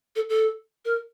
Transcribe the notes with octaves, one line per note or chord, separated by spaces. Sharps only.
A4
A4
A#4